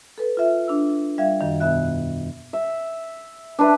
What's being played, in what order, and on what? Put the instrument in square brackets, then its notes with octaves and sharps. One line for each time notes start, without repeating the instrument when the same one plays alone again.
[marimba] A4 B4
F4 E5
D4 E6
G3 E5 F5 G#6
F#2 D#3
E2 B2 B3 E5 F#6
[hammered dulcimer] E5
D4 B4 E5